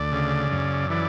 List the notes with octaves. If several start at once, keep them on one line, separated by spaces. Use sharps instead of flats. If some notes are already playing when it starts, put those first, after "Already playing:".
Already playing: D2 D5
C#3
F#2
E3 D5